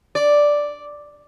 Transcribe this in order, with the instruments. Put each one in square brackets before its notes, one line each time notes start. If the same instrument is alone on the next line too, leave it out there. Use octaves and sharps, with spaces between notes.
[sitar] D5